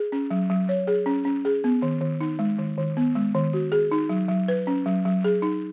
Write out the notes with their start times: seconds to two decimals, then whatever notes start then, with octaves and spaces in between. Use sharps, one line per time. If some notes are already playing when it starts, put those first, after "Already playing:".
Already playing: G#4
0.12 C#4
0.31 F#3
0.50 F#3
0.69 C#5
0.87 G#4
1.06 C#4
1.25 C#4
1.45 G#4
1.64 B3
1.82 D#3
2.01 D#3
2.21 D#4
2.39 G#3
2.58 D#3
2.78 D#3
2.97 B3
3.15 G#3
3.35 D#3
3.54 F#4
3.72 G#4
3.92 D#4
4.10 F#3
4.28 F#3
4.48 B4
4.67 C#4
4.86 F#3
5.05 F#3
5.24 G#4
5.42 D#4